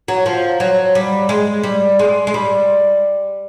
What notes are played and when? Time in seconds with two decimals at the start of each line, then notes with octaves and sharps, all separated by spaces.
0.08 F#3
0.26 F3
0.60 F#3
0.95 G3
1.29 G#3
1.64 G3
1.99 G#3
2.27 G#3
2.34 G3